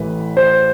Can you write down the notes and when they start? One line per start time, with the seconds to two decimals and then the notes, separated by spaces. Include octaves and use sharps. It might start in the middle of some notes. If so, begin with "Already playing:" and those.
Already playing: A1 A2 E3 B4
0.37 C5